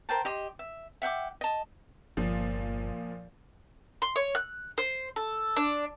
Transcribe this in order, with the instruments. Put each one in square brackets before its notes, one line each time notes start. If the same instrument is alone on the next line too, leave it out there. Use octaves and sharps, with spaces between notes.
[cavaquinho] A#4 C5 G5 A5
G4 D#5 C6
E5
E5 F#5 G5 D6
D#5 A5
[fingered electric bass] G1 [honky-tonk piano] A#2 F3
[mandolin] C6
C#5
F#6
C5
A4
D4